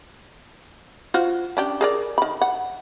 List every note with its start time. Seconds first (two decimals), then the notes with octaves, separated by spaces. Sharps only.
1.14 F4 F#4 C5
1.57 C#4 D4 G4
1.81 G#4 A#4 D5
2.18 D#3 B5
2.42 F#5